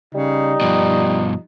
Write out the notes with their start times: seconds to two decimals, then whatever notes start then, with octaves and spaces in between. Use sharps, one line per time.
0.15 C#3 G3 D#4
0.61 G2 B2 F3